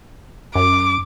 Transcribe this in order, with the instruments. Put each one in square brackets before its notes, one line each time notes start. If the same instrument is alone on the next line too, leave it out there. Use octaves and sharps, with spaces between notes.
[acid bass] F#2 [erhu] D6